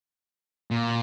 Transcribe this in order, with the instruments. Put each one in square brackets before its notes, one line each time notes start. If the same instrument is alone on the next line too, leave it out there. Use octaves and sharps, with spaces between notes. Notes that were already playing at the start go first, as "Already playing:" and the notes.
[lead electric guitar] A#2